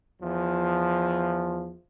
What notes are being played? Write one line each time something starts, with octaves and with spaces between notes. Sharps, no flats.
E2 F3